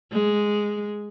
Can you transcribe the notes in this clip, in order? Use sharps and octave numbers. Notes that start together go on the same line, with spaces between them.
G#3